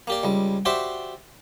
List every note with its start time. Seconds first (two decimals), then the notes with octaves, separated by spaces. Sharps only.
0.07 A#3 G4 D5
0.23 C#2 G3
0.65 F#4 G4 C5 D5 E5